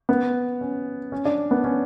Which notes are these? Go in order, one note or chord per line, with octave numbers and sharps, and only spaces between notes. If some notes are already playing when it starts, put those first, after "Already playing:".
B3
C#4
C#4
D4
B3
C#4